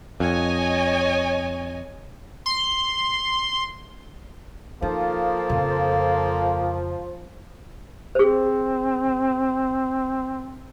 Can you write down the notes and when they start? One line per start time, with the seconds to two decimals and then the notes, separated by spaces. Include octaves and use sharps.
0.20 F2 C#5 D#5 G#5
2.46 C6
4.82 F3 A#3 D#4 A4
5.50 F2 C#3
8.15 C4 G#4 C5